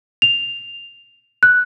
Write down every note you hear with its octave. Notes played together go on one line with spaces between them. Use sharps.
F7
F#6